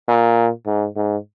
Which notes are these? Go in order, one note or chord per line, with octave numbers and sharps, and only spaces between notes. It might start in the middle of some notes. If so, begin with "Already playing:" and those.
A#2
G#2
G#2